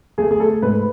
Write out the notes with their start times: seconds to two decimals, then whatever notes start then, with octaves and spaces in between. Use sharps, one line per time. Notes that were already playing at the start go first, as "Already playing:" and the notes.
0.18 A3 G#4
0.31 G#4
0.40 A3 A4
0.62 G#2 B4